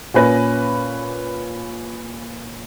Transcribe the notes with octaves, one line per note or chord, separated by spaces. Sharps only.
A#2 C#4 B4 A#6